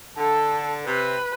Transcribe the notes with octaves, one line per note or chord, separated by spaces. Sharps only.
D3 A4
C3 B4